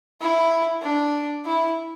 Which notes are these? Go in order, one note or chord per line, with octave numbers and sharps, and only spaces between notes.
E4
D4
E4